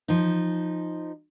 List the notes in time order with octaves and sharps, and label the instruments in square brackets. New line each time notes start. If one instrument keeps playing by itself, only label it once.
[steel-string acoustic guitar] F3 D#4